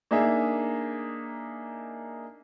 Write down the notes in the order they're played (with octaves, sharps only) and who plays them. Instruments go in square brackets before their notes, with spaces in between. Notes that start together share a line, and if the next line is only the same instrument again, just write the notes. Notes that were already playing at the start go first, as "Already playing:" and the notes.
[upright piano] A#3 D4 D#4 G#4 E5